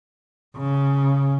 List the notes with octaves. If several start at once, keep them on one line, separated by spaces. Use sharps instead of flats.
C#3